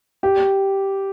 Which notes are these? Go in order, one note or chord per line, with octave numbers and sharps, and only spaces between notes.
G4